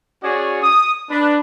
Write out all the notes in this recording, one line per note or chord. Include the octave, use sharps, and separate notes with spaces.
C#4 F#4 G#4 C#5 D5
D#6
D4 B4